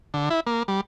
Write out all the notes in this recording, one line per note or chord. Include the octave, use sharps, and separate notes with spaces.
D3
E4
A#3
G3